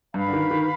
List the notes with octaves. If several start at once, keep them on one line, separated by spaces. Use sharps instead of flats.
G2 B4 F5 B5
D3
D#3
D#3